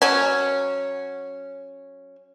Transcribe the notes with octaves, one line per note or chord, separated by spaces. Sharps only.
F#3 C#4